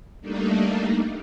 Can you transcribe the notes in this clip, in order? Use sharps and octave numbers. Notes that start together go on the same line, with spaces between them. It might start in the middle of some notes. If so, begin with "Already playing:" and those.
G3 A3 A#3 D4 D#4